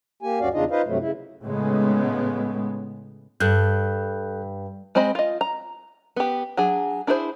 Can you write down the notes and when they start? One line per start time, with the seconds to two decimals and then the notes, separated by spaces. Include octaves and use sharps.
0.23 A#3 G4 G#5
0.40 D2 G2 C#4 F#4 D5 F5
0.53 E2 C#3 D4 D#4 F4 D#5
0.71 D#4 F4 B4 C5 D#5 F5
0.86 G2 C3 F#3 A3
1.00 C#3 E4
1.43 A2 C#3 G#3 B3
3.40 G2 A4 F#6 G6
4.95 G#3 C4 C5 D#5 B5
5.15 F4 D#5
5.41 A#5
6.16 B3 G4
6.57 F#3 D4 G#4
7.07 D4 E4 G#4 A#4 C5